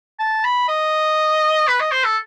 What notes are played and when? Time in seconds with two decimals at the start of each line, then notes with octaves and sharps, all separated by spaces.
0.20 A5
0.44 B5
0.69 D#5
1.68 B4
1.80 D#5
1.92 C5
2.04 A4